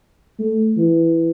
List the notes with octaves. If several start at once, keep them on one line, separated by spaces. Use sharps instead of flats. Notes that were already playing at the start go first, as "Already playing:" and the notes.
A3
E3